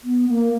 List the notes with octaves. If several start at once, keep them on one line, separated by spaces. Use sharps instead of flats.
B3
A#3